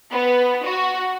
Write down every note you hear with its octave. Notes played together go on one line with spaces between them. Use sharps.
B3
F#4